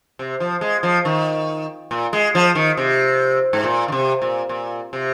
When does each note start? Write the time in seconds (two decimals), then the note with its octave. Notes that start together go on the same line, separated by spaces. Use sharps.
0.19 C3
0.40 F3
0.61 G#3
0.83 F3
1.05 D#3
1.91 A#2
2.13 G#3
2.35 F3
2.55 D#3
2.77 C3
3.53 G#2
3.64 A#2
3.88 D#3
3.92 C3
4.22 A#2
4.49 A#2
4.93 C3